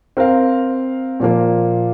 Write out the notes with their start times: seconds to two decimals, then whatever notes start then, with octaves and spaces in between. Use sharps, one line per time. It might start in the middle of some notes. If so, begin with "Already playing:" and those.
0.17 C4 A#4 F5
1.20 A#2 F3 A#3